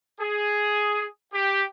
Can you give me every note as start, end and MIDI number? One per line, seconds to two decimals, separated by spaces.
0.20 1.04 68
1.32 1.63 67